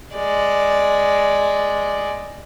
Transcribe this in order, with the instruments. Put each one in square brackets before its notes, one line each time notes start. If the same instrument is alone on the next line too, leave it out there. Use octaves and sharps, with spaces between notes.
[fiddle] G#3 D5